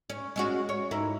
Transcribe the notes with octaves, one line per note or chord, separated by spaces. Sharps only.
C#4
G#3 C#4 F#4
C#5
G#2 E4 A#4